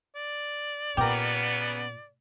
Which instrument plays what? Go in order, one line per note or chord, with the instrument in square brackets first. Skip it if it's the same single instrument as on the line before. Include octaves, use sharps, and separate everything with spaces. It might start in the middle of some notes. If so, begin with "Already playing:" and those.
[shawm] D5
[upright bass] A#2 [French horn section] C#3 B3 [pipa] G4 A#4